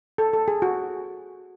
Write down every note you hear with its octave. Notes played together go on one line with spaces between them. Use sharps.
A4
A4
G#4
F#4